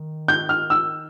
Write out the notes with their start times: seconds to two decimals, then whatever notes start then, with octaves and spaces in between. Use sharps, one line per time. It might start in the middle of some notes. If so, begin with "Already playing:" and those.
Already playing: D#3
0.28 G6
0.49 F6
0.70 E6